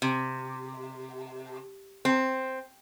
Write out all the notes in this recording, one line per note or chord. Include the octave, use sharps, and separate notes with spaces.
C3
C4